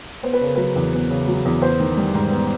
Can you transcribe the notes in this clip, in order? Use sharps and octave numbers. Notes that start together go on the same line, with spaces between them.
B3 C5
B4
C#3 A#4
F#3 B4
E2
B3
C#3
F#3
E2
B3 C5
D#3
G3
G#2
B3